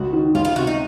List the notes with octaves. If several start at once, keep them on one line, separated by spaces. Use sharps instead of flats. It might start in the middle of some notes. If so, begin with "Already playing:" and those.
Already playing: C#2 C#3 F#4
D#3
C#2 F4
F4
C3 F#4
D#4